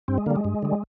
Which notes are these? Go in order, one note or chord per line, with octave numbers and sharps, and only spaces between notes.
G2 C4
G#3
D3 G3 A#3
G#3
G2
D3 G3